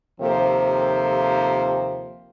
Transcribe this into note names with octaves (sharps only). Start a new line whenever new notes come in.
D#2 C3 F3 A#3 A4 C5